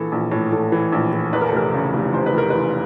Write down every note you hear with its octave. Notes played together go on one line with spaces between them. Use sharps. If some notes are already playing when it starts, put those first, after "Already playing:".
Already playing: A#1 E3 A4
A#1
A2
A2 A4
E3
A#1
E3
E2 B4
A#4
A4
F1 A#4
C#3
F1
F1 C5
B4
F1 A#4
E2 B4